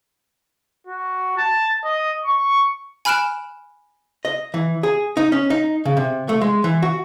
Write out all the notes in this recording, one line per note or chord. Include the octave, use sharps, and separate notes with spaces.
F#4
A5
D#5
C#6
G#5 B5 F6 F#6 D7 E7
D#5
E3
G#4
D#4
C#4
D#4
C#3
C3
A3
G#3
E3
F#4